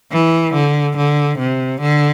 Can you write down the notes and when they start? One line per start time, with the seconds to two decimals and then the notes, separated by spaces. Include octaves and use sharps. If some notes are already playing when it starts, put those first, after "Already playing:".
0.12 E3
0.54 D3
0.97 D3
1.39 C3
1.81 D3